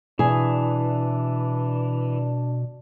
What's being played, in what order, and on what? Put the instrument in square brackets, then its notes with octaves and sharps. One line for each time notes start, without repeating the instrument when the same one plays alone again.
[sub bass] B2 [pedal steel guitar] E3 [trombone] D4 [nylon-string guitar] G#4